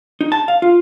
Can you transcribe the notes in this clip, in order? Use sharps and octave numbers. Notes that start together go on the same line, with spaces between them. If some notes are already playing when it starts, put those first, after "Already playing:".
D#4
A5
F5
F4